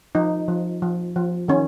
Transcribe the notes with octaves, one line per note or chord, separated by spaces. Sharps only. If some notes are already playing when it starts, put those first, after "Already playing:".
F3 D#4
F3
F3
F3
D#3 C#4